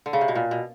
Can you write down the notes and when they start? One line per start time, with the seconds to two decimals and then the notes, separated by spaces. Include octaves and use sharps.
0.06 D3
0.13 C#3
0.21 C3
0.28 B2
0.35 A#2
0.51 B2